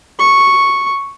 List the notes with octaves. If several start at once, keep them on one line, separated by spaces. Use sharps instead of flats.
C#6